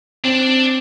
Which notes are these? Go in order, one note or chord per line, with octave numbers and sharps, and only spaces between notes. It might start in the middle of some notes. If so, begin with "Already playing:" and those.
C4 D4